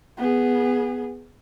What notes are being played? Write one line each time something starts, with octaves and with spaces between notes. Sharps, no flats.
B3 G#4